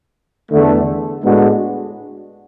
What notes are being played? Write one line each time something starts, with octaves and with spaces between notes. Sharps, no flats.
E2 D3 A3
A2 G#3 B3 D4 F#4